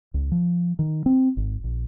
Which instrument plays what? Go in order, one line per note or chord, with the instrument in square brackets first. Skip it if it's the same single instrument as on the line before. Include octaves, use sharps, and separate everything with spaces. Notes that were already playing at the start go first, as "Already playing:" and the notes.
[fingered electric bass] C#2
F3
D#3
C4
G#1
A#1